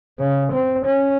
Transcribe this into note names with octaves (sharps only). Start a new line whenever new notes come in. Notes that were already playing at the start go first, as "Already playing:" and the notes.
C#3
C4
C#4